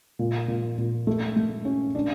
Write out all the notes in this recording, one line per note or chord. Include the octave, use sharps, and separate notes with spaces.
A#2
A#2
A#2
A3
A3
C#4
D4